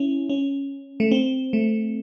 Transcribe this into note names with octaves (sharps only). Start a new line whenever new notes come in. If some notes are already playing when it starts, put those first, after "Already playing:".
Already playing: C#4 E4
C#4
A3
C4
A3